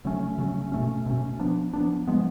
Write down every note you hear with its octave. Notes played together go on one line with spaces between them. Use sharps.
C#3 F#3 A3 C#4
C#3 F#3 A3 C#4
B2 A3 C#4
B2 A3 C#4
F3 B3 D4
F3 B3 D4
F3 G#3 B3